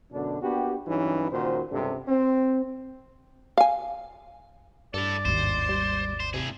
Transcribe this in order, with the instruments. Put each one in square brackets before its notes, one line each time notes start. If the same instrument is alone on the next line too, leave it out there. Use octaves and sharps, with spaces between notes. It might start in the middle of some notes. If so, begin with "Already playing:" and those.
[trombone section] F#2 B2 D3 D4
A#3 B3 D4 F#4 G4
G2 E3 F#3 C#4 D#4
C#2 A#2 D#3 F#4 C5
C#2 G2 C3 D4 A4 C5
C4
[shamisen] F5 G#5
[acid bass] G2 [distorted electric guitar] E4 A4 [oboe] D5
[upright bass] G#1 D#2 [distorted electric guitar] C5
[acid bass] G3
[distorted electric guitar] C5
[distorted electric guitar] A2 G#4 [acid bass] C3